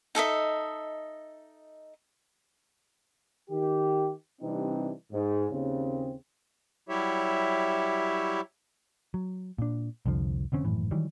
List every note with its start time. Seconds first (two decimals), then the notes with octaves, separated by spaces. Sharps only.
0.15 D#4 A4 D#5 E5
3.50 D#3 G4
4.41 C3 E3 G3 C4 D4 D#4
5.13 G#2
5.51 D#2 C#3 C4
6.89 F#3 G3 E4 G4 C#5 E5
9.14 F#3
9.58 A#2 D4
10.06 C2 F2 D3 F3
10.52 F1 D3 C4 C#4
10.65 G#1 F#2 A2 E3
10.91 D#3 E3 F#3 G3